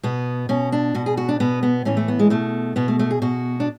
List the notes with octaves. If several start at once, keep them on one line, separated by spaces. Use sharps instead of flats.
B2 B3
B2 C#4
D4
B2 F#4
G#4
F#4
D4
B2 B3
B3
A2 E3 C#4
A3
B3
G#3
B2 A3
B2 B3
A3
A3
G#4
B2 F#4
D4